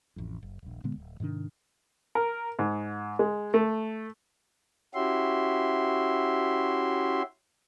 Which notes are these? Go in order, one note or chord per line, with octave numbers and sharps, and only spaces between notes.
A1 F2
F#1
D#1 A#1
A#2 D3 G#3 B3
D1
G#2 C3 D#3 D4
A#4
G#2
G#3
A3
C#4 E4 F#4 G4 E5 C6